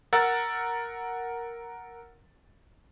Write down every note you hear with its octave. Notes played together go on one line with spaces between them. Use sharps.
A#4 F#5 E6 A6